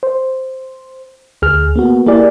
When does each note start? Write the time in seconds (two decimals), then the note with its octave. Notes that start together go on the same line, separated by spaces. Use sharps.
0.03 C5
1.42 D2 G#4 F6
1.76 A#3 B3 F#4
2.06 A#3 E4 G4 G#4 D5